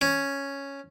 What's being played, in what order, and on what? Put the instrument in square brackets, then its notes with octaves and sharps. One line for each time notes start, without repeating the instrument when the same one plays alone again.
[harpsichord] C#4